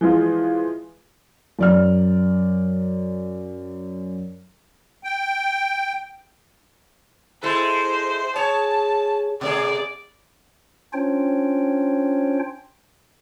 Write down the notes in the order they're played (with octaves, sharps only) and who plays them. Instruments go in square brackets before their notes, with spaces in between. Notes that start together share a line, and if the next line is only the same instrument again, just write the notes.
[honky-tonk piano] E3 F3 G#3 F4
[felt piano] F#2 D5 F6
[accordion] G5
[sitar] G#3 E4 A4 [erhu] C5
[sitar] G#4 C#5 [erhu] A5
[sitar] B2 A3 G#4 [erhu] D5
[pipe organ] C#4 D4 F4 C5 C#5 G5